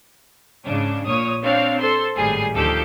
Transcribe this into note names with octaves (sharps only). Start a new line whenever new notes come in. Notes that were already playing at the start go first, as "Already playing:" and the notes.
G#2 C#3 D4
A#1 A#2 C#5 D#6
C4 D4 C#5 F5
A4 C5 C6
G#1 A2 G3 G#4 G#5 C7
D2 D#3 F3 G4 A4 G6